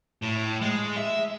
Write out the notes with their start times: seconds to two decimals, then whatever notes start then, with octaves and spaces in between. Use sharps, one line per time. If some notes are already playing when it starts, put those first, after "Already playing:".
0.22 A2
0.61 G#3
0.97 E5